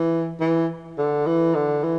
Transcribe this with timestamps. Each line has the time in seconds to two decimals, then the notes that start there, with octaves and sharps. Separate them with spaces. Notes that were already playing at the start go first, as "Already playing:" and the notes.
Already playing: E3
0.40 E3
0.98 D3
1.26 E3
1.55 D3
1.83 E3